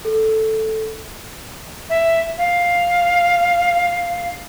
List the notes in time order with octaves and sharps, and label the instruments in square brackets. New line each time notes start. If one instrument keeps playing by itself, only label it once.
[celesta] A4
[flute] E5
F5